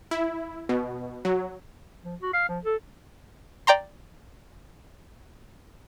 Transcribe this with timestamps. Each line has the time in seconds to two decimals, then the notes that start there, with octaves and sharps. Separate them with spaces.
0.11 E4
0.69 B2
1.25 F#3
2.04 F3
2.21 F#4
2.33 F5
2.49 F3
2.65 A4
3.67 D5 G5 A#5 C6